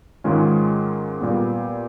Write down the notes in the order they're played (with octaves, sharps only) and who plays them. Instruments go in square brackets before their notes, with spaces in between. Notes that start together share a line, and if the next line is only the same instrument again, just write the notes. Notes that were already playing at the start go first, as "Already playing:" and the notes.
[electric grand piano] G#2 D#3 G#3 C#4 F4
A#2 G3 B3